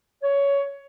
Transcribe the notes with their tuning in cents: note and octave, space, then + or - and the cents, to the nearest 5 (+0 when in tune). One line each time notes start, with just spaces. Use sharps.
C#5 +15